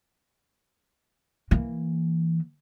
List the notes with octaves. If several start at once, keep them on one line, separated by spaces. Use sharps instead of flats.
E3 A#3